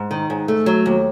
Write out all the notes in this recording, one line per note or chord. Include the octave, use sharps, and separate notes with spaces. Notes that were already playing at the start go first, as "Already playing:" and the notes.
Already playing: G#2
D#3
G#2
A3
F#3
D#2